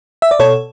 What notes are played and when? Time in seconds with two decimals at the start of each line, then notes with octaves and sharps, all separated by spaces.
0.22 E5
0.31 D5
0.40 B2 A4 C#5